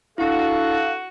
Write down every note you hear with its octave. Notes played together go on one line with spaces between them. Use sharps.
D4 E4 F#4 A4 F5